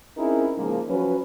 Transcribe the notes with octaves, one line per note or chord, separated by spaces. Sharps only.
C4 C#4 D#4 E4 G#4 A#4
C#3 F3 G#3 A#3 D#4
F3 F#3 C#4 B4